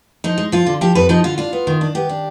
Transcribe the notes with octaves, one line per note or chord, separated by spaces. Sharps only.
F3 D#4
G#3
F3 F4
D3
F3 G4
F2 B4
F3 D#4
D3 F4
D4 F4
B3
D#3
D4
B3 G4
D4